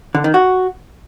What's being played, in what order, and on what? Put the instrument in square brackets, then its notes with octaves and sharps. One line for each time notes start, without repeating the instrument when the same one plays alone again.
[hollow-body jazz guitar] D3
D#3
F#4